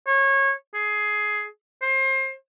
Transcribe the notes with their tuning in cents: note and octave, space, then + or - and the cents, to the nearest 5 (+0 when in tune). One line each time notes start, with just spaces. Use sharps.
C#5 -25
G#4 +15
C5 +30